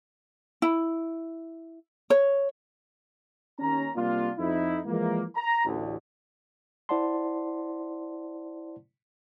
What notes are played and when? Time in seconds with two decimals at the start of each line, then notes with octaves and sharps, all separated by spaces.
0.62 E4
2.10 C#5
3.59 D#2 C#4 A#5
3.95 C3 G3 A#3 D4 F4
4.38 F2 D#4 E4
4.86 E3 F3 G#3 A#3
5.36 A#5
5.65 A1 D2
6.89 E4 C5 D5 F#5 A5 C6